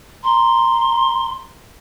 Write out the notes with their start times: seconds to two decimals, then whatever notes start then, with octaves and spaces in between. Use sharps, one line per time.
0.23 A#5 C6